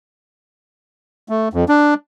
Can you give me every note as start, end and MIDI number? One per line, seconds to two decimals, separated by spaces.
1.29 1.49 57
1.54 1.65 41
1.69 1.94 62